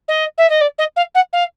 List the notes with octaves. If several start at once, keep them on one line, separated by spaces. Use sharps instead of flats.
D#5
E5
D#5
D5
D#5
F5
F#5
F5